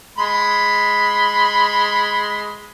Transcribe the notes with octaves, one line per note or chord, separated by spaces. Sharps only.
G#3 B5 C6